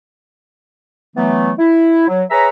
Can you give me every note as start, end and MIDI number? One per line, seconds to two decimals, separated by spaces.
1.16 1.52 52
1.16 1.52 54
1.16 1.52 57
1.16 1.52 59
1.58 2.07 64
2.08 2.24 54
2.31 2.49 68
2.31 2.49 71
2.31 2.49 73
2.31 2.49 76
2.31 2.49 82